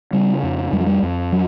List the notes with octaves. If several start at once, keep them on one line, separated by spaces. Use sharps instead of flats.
C#3 G3
F2
F2 G3
F#3
G3
F2
F#3